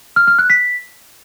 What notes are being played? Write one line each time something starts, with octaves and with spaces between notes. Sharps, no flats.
F6
F6
F#6
B6